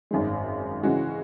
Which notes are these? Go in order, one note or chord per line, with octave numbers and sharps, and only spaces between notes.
G#1 F#2 D#3 G#3
C#3 E3 G#3 C#4 F#4